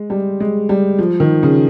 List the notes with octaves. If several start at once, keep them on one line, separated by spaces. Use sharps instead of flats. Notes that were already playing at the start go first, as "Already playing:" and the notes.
Already playing: G#3
G3
G#3
G3
F3
D#3
C#3